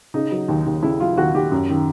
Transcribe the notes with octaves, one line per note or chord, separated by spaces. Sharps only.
C#3 D#4
F#3
D#2
D#2
C#3 E4
F#3 F4
D#2 F#4
D#2 G4
F#2
D#3